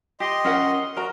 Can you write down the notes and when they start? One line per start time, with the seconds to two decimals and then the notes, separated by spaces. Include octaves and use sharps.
0.20 G4 D#5 C6
0.45 C#4 A#4 F#5
0.97 F#4 A#4 A#5